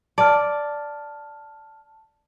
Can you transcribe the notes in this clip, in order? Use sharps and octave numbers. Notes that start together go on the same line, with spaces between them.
D5 A5 F6